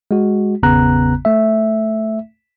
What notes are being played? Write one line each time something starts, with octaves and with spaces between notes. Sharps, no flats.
G#3 F#4
G#1 E2 C#3 B3 A#5 F#6
A3 E5